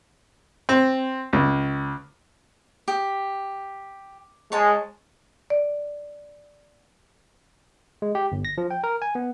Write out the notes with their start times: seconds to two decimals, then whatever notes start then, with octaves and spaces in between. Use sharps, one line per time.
0.69 C4
1.33 C#2
2.88 G4
4.52 G#3 C#5 A5
5.50 D5
8.02 G#3
8.15 G4
8.32 G1
8.45 A#6
8.58 F3
8.71 G5
8.84 A#4
9.02 G#5
9.15 B3